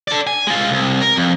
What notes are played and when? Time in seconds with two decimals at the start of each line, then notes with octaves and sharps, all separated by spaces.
0.08 A4 D5
0.27 G#5
0.47 G#3 F4
0.71 C2
1.02 A#4
1.16 F2